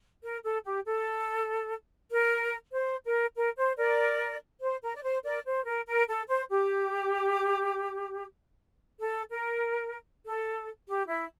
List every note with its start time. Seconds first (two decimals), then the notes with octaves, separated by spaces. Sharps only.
0.23 A#4
0.43 A4
0.64 G4
0.85 A4
2.11 A#4
2.73 C5
3.04 A#4
3.35 A#4
3.57 C5
3.77 A#4 D5
4.61 C5
4.82 A#4
4.95 D5
5.03 C5
5.24 A#4 D5
5.45 C5
5.66 A#4
5.87 A#4
6.08 A4
6.28 C5
6.49 G4
8.99 A4
9.31 A#4
10.25 A4
10.88 G4
11.08 E4